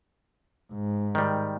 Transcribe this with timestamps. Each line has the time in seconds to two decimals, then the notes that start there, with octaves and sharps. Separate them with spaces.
0.73 G#2
1.15 D#3 G3